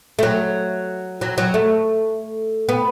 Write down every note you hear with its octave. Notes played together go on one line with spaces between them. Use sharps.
A3
F#3
F#3
F#3
A3
B3